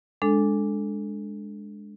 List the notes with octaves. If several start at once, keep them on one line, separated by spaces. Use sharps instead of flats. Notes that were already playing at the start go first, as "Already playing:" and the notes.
G#3 D4 A4